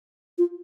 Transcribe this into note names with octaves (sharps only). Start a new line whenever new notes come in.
F4